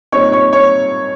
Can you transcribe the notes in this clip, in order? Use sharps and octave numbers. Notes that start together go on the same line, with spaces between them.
A#2 G3 C4 D#4 C#5 C#6
C#5 C#6
C#5 C#6